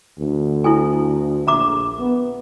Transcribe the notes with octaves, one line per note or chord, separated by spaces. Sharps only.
D2
E4 A4 G#5
A#1 E5 A#5 D6
B3